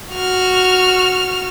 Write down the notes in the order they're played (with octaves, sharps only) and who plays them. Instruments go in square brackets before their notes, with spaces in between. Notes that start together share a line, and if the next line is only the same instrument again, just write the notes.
[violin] F#4 F6